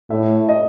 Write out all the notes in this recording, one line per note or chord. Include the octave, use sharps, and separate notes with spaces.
A2 E5
D#5